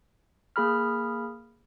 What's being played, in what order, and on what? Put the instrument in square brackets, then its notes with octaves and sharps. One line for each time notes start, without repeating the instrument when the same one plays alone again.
[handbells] A#3 G#4 B5 F6